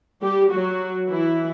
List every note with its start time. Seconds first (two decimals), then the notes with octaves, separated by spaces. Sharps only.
0.22 G3 G4
0.51 F#3 F#4
1.08 E3 E4